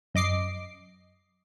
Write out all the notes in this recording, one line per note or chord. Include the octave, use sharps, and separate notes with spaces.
F#2 D#5 D6 C7